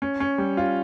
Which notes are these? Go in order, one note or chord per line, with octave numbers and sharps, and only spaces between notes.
C#4
C#4
G3
F4